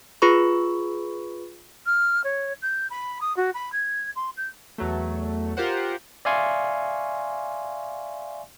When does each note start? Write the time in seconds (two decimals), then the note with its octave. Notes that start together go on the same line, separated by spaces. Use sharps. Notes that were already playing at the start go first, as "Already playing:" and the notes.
0.22 F4 G#4 B4 B5 C#6
1.86 F6
2.24 C#5
2.62 G6
2.90 B5
3.21 D#6
3.37 F#4
3.54 B5
3.72 G#6
4.16 C6
4.37 G6
4.78 E2 F#3 A3
5.57 F4 G4 A#4 C5 F#5
6.25 D5 E5 F5 G#5 C6 C#6